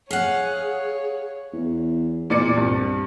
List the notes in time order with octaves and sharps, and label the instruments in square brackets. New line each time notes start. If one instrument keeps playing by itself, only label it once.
[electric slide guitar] G#4 [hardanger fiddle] C#5 [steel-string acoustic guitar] F5 F#5
[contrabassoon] E2
[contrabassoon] E2 [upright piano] A#2 D5 C#7
[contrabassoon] C2 [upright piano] G2